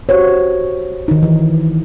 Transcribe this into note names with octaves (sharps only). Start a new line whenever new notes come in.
F#4 G4 C5 C#5
D#3 D#4
E3